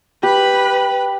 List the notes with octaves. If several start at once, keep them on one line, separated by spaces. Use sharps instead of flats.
G4 B4 B5